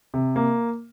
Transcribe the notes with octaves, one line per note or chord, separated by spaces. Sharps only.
C3
A#3